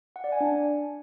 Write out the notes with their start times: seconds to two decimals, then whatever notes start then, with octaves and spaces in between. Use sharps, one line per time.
0.16 F#5
0.24 D5
0.32 G#5
0.40 D4